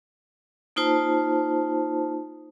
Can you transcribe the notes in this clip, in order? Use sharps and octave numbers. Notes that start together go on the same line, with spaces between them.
A#3 D#4 F4 C5 A5